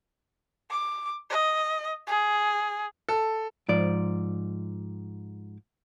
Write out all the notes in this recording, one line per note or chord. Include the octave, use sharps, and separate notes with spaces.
D6
D#5
G#4
A4
G#2 F3 D5